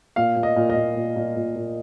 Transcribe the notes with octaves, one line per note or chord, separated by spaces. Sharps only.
A#2 F5
A#2
D#5
A#2
D#5
A#2
A#2
A#2
A#2
A#2